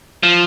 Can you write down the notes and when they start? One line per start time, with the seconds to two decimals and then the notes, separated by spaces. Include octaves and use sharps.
0.23 F3